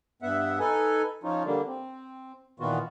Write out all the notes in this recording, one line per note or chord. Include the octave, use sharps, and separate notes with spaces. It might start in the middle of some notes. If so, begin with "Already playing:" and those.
G2 B3 E5 F#5
D#4 A4 B4 G#5
F3 C#4 D#4 F4
D3 G3 A#3 D4
C4
A#2 D#3 E3 B3 F4 F#4